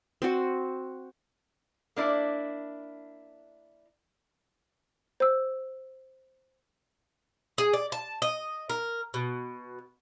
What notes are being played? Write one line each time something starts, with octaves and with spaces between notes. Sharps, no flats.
C4 F#4
A#3 D4 E4
C5 E6
G#4
D5
A5
D#5
A#4
B2